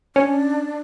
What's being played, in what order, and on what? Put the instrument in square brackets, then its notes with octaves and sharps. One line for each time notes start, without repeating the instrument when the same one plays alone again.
[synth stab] C#4 [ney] D4